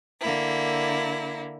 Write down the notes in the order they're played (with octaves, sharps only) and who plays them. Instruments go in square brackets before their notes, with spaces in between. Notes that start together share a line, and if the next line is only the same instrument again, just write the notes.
[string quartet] D3 A#3 E4